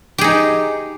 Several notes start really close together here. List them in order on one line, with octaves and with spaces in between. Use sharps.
G4 G#4 D#4